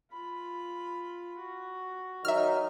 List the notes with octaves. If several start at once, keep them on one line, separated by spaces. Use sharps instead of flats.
F4 B5
F#4
D#3 F#3 D#4 E5 F6